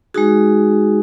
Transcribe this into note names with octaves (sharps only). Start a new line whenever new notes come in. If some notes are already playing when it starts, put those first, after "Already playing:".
G#3 D#4 F#4 G#4